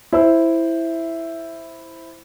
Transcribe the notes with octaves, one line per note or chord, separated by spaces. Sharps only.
E4 C5 E6